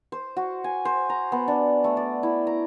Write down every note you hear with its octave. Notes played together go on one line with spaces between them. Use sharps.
C5
F#4
G#5
C5
A#5
B3
D4
A3
D5
E4
A#5